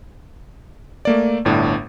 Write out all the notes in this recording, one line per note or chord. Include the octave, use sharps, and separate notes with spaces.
A3 A#3 D5
G1 A2 D4